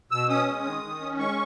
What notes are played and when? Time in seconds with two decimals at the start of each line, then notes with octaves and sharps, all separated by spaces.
0.11 B2 E6
0.29 C#4 D#6
0.47 G#3
0.65 D#3
0.83 D#3
1.00 C#4
1.18 G#3 C#6